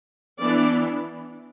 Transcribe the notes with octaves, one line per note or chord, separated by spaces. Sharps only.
E3 B3 D4 D5